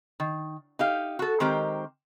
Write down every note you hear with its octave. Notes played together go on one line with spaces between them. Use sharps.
D#3
D#4 G4 F5
F#4 A4
D#3 G#3 C4 G4 A#4 C5